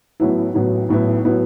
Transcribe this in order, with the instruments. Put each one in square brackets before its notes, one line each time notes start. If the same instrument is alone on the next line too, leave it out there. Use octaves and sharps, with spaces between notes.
[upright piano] A1 A2 F#3 B3 E4
A1 A2 F#3 B3 E4
A1 A2 F#3 B3 E4
A2 F#3 B3 E4